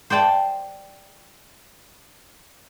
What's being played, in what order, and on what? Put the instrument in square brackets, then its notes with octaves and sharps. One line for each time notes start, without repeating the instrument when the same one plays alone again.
[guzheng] C5 D5 G5 A5